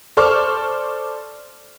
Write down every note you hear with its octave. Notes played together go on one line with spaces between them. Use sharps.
A4 C5 D5 C#6 D6 F6